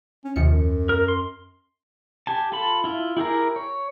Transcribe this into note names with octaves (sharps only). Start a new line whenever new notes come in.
C#4
D#2 C3 F3 C#7
F#2
A#4
C6
G4 G#5 A5
F4 A4 A5 B5
E4 F4 E5
E4 G4 G#4 A#4
C#5